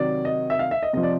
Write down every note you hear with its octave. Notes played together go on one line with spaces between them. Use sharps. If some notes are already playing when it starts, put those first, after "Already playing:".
Already playing: C3 D#3 F#3 D5
D#5
E5
F5
E5
D#5
C3 F3 D#5
D5